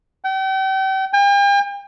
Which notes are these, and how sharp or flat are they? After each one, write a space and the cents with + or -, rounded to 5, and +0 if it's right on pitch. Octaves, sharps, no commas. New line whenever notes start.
G5 -40
G5 +45